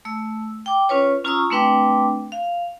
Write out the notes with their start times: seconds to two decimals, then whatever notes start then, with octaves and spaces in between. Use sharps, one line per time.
0.05 A3 E6
0.66 G5 D6
0.89 C#4 F4 B4 C#5
1.24 C#4 F4 A#5 C#6 D#6 E6
1.51 A3 C4 D4 B4 G5 D6
2.32 F5